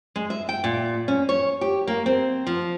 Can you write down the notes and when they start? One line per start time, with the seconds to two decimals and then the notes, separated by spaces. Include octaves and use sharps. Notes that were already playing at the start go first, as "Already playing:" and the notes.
0.16 G#3
0.30 E5
0.49 G5
0.64 A#2
1.08 C#4
1.29 C#5
1.61 G4
1.88 A#3
2.06 C4
2.47 F3